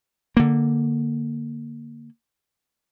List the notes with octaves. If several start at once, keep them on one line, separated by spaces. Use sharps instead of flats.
D3 A#3